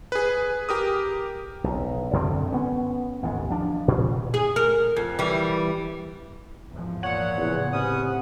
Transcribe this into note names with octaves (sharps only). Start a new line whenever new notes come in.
G#4 B4
G4 A#4 D#6
B1
F#2 D3 C4
B3 C#4
A1 D#2 G#2
F3 D4
A#2
G#4
A#4
F2
E3 G3
E2 G#2 F3
A#2 C#5 F#5
E2 A2 C#3
C3 B3 C#4 D#6